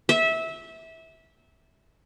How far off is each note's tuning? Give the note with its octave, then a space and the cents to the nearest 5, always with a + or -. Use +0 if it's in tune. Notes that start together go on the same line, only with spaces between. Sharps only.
E5 -20